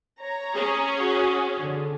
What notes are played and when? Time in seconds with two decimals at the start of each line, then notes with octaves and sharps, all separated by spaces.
0.21 C#5 A#5
0.55 C#4 G#4
0.99 F#4
1.58 D3